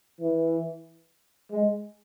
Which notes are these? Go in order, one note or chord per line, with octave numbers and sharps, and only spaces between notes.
E3
G#3